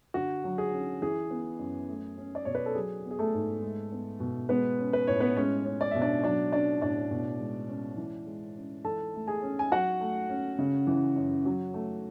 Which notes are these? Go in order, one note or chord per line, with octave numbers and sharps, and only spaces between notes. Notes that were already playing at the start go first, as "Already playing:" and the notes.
D3 F#4
F#3
G#4
C#4
E3 G#4
B3
F#2
A3
C#4
D5
B2 C#5
B4
A4
F#3 G#4
B3
G#4
A3 A4
G#2
G#3
B3
B2
G#3 B3 B4
C#4
B4
A2 C#5
B3 B4
G#3 C#4 C#5
C#4
D5
B2 E5
D4 D5
F#3 D4 D5
C#4 D4 D5
A2 D4 D5
B2
G#3
C#4
E3
G#3
C#4
E3 A4 A5
A3
G#4 G#5
C#4
G#5
F#3 F#4 F#5
A3
C#4
C#3
E3
F#2
F#3
A3